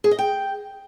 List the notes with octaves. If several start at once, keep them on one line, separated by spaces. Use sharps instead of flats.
G#4
D#5
G5